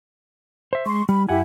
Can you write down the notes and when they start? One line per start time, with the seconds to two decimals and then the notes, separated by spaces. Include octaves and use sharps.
0.73 C5 E5
0.86 G#3 C6 C#6
1.09 G3 B5
1.29 F#2 E4 G4 F#5 G#5